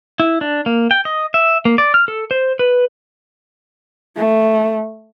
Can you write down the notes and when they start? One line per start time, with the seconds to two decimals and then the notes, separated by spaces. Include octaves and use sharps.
0.20 E4
0.41 D4
0.66 A#3
0.91 G5
1.05 D#5
1.34 E5
1.65 A#3
1.78 D5
1.94 F6
2.08 A4
2.31 C5
2.59 B4
4.17 A3